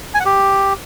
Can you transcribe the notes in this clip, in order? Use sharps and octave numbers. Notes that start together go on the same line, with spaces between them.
G#5
F#5
G4